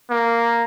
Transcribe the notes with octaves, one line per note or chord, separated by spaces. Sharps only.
A#3